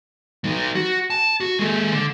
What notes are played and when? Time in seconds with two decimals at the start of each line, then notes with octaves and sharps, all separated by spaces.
0.44 F#3 D#4
0.75 F#4
1.10 A5
1.40 F#4
1.59 G#3 A4
1.92 D3